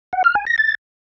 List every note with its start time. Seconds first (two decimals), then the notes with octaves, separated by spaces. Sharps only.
0.13 F#5
0.24 F6
0.35 G#5
0.47 A#6
0.58 A6